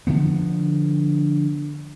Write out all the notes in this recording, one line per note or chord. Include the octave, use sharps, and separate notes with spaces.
D3 F3 B3